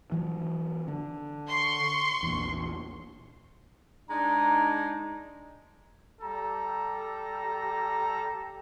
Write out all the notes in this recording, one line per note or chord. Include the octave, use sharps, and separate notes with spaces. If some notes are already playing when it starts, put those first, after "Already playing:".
E3 F#3
D3
C6 C#6
A#1 E2
G#3 D4 D#4 A#5
G3 G4 A4 A#5